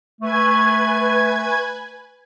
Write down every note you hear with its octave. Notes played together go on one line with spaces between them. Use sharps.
A3 B4 G#5 G#6